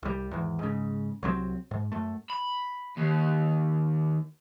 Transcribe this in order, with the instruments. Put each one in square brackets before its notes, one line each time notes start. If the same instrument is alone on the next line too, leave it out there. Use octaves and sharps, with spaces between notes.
[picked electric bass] C2 G3
G#1 E2
G#2 C#3
C2 F#3 G#3 C4
G#2
F#2 A3
[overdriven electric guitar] B5
D#2